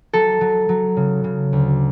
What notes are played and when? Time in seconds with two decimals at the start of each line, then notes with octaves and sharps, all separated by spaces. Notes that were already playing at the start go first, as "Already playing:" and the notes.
0.13 F#3 A4
0.41 F#3
0.69 F#3
0.97 C#3
1.24 C#3
1.53 D2